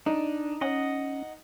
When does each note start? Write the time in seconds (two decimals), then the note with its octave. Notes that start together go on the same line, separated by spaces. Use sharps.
0.06 D4 D#4
0.61 C#4 D#5 F#5